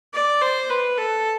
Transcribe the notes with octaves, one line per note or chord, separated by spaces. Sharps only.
D5
C5
B4
A4